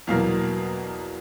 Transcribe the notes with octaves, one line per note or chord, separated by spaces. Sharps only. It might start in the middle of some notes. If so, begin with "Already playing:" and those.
E2 B2 F#3 A#3 F5